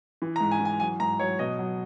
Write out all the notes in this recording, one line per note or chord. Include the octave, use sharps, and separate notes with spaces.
E3
A#5
G#2
G#5
E3
G#5
F#3 G#5
G#2 A#5
F#3 C#5
B2 D#5
F#3